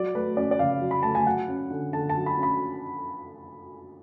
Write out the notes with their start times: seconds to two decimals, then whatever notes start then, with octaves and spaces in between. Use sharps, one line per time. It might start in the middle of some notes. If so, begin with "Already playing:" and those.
Already playing: F#3 D5
0.15 A3 B4
0.37 C#4 D5
0.51 D5
0.59 C#3 F5
0.81 F#3
0.91 B5
1.03 A3 A5
1.15 G#5
1.26 F#3 F#5
1.48 C#4
1.71 D3
1.93 D3 A5
2.09 A5
2.15 F#3
2.26 B5
2.38 C#4
2.43 B5